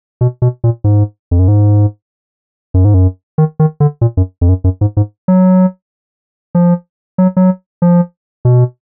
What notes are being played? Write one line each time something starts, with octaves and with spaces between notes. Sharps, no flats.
B2
B2
A#2
G#2
F2
F#2
G#2
F#2
G#2
F#2
D#3
D#3
D3
A#2
F#2
F2
F#2
F#2
G#2
G#2
F#3
F3
F#3
F#3
F3
B2